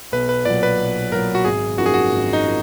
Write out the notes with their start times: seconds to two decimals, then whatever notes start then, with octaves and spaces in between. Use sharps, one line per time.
0.12 B1 B4
0.29 B4
0.45 A#2 F#3 D5
0.63 B4
0.79 B1
1.12 A#2 F#3 A#4
1.35 F#4
1.45 G#1 G#4
1.78 F#2 F3 A#3 D#4 F#4
1.86 G#4
1.94 F#4
2.11 G#1
2.33 D#4
2.45 F3 A#3